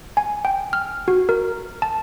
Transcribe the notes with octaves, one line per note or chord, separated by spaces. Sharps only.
G#5
G5
F6
F#4
A#4
A5